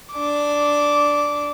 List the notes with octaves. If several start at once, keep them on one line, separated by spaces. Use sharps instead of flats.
D4 D6